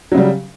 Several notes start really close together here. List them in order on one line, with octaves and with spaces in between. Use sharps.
F#3 C#3 G3